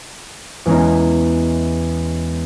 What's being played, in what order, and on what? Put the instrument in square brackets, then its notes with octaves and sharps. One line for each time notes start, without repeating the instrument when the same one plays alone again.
[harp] E2 G#3 C#4 A#5